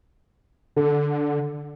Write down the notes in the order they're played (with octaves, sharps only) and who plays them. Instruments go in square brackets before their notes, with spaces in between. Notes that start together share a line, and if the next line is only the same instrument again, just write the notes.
[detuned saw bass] D3 [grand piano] A4